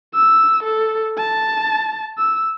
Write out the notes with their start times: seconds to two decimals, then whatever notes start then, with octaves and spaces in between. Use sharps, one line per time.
0.15 E6
0.63 A4
1.18 A5
2.18 E6